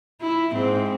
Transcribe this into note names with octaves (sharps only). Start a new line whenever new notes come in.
E4
G#2 C4